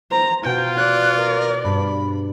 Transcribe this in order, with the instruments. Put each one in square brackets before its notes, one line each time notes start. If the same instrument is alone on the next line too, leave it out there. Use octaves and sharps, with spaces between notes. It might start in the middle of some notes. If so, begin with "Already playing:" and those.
[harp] C5 [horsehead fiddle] A#5
[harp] B2 F#4 [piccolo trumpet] F4 [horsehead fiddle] G5
[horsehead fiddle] D5 [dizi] F#6
[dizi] A#4
[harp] G2 [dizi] B5